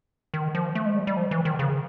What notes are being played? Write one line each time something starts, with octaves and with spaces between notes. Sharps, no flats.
D#3
F3
A3
G#3
G3
G3
F3
E3
D#3
C#3